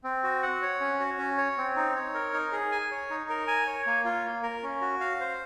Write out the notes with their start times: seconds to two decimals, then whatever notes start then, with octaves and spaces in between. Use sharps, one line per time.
0.04 C4
0.23 F#4
0.43 F#5
0.62 C#5
0.80 C#4
1.00 F#4
1.18 C#4
1.38 C#5
1.58 C4
1.76 D#4
1.96 C#5
2.14 A#4
2.33 D#4
2.52 G#4
2.72 G#5
2.91 C#5
3.10 D#4
3.30 A#4
3.47 G#5
3.67 C#5
3.86 A#3
4.05 F4
4.25 A#3
4.43 A#4
4.63 C#4
4.81 F#4
5.00 F5
5.20 C5